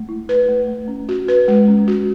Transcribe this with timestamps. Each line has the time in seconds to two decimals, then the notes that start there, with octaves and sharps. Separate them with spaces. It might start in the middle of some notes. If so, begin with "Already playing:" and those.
Already playing: A3
0.09 E4
0.29 B4
0.48 A3
0.68 A3
0.88 C#4
1.09 F#4
1.28 B4
1.48 G#3
1.68 C#4
1.88 F#4